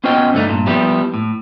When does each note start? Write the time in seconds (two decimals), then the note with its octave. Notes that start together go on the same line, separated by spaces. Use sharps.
0.04 B3 C#4 F4 C5 D#5 G5
0.33 G2 D3 A3 D#4
0.47 G2 A#2
0.67 F3 G3 B3 E4 G4
1.14 A2